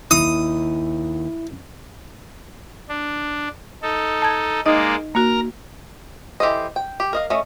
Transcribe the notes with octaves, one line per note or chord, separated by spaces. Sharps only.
D#2 E4 D#6
D4
D#4 A4
A5 G#6
G#3 A#3 D#4 D5 D#5
A#3 F#4 A#4 A#5
E3 G4 A4 C5 D#5
G5
G4
A#4 D#5 F5
A3 C#4 D#5